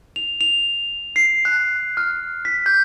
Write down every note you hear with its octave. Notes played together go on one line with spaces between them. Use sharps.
F7
F7
C7
F#6
F6
B6
G6